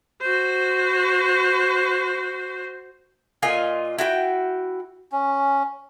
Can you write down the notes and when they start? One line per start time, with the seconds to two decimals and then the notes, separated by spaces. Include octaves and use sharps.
0.21 F#4 C5
3.42 A#2 F4 D#5 G#5
3.98 E4 F#4 G5
5.12 C#4